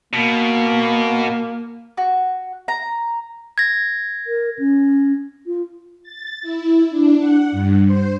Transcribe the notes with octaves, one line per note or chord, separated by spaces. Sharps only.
B2 A#3
F#4
A#5
G#6 A#6
A#4
C#4
F4
A6
E4
D4
F#5
G2
C5